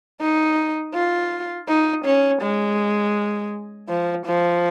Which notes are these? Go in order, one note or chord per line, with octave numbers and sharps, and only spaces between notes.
D#4
F4
D#4
C#4
G#3
F3
F3